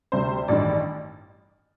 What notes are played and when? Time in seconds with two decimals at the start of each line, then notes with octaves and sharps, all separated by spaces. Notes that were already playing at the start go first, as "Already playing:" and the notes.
0.12 D2 C3 G3 C5
0.48 A1 G2 D#3 D5